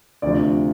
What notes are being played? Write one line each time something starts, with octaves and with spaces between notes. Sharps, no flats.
D2 C3 F3 D5